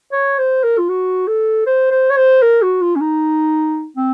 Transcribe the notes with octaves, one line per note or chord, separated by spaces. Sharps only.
C#5
C5
A#4
F4
F#4
A4
C5
C5
C#5
C5
A#4
F#4
F4
C#4
D#4
C4